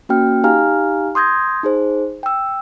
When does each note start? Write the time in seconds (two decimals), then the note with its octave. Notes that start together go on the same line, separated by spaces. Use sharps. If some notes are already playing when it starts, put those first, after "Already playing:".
0.09 A#3 C#4 F#4 G5 F6
0.44 D#4 G4 F5 G#5 A#5 F6
1.15 C6 D#6 G6 G#6 A#6
1.63 D#4 G#4 C5
2.23 G5 E6